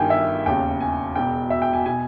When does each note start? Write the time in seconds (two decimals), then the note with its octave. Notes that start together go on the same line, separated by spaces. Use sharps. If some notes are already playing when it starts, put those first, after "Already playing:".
Already playing: G1 G2 D#3 G5 G#5
0.10 E5
0.46 E1 D#2 C#3 G5
0.80 G#5
1.16 E1 E2 B2 G5
1.50 E5
1.62 G5
1.73 G#5
1.86 B2 G#5